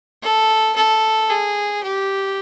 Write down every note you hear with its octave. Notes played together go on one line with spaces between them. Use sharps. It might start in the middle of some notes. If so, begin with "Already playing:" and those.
A4
A4
G#4
G4